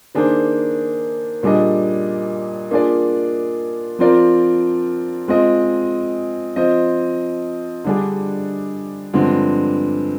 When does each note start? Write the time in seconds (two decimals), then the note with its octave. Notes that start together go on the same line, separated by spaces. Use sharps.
0.15 D#3 A#3 D4 G#4 C5
1.43 A#2 G3 D4 G#4 D#5
2.71 A#3 D4 F4 G#4 D5
3.99 F3 C4 F4 A#4 D5
5.28 G#3 C4 F4 G#4 D#5
6.56 F3 C4 F4 C5 D#5
7.85 D3 G3 D4 G#4
9.14 G2 D3 F3 G#3 C4